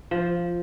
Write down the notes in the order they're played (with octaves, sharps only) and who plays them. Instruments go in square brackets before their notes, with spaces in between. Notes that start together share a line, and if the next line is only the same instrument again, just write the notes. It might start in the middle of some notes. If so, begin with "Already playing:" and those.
[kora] F3